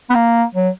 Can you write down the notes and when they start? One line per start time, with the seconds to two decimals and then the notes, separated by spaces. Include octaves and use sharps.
0.10 B3
0.15 A#3
0.55 F#3